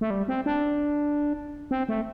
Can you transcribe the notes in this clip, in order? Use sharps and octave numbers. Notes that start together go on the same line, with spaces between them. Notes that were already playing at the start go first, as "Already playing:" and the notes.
A3
G3
C4
D4
C4
A3